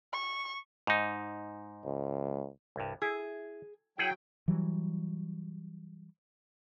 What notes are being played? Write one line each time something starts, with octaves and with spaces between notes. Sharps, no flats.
C#6
G#2 D#4
C#2
C2 G2
E4 G#4
F#3 E4 G#4 F#5 G5
E3 F#3 G3